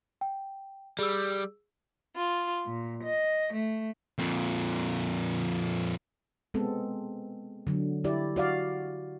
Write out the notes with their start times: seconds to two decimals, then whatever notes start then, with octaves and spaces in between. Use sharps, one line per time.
0.21 G5
0.99 G3 G#4 E6
2.16 F4
2.66 A#2
3.03 D#5
3.53 A3
4.19 F2 A#2
6.54 G#3 B3 C4 A4
7.67 D3 F#3
8.04 E4 G4 D5
8.36 F#4 D5 F5